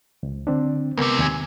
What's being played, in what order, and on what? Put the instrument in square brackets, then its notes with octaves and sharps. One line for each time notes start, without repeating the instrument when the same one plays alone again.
[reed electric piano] C#2
D3 C4 D4
[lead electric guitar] C#2 C3 [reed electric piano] B3 A#4
[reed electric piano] D#2 G#5 G#6